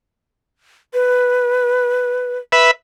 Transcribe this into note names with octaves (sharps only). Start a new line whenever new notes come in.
B4
B4 E5